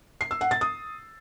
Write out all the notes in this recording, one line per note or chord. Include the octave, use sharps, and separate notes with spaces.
C7
E6
F#5
A6
D#6